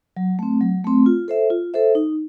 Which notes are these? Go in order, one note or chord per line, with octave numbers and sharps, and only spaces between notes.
F#3
A3 C4
F#3
A3 C4
F4
A4 C5 E5
F4
A4 C5 E5
D#4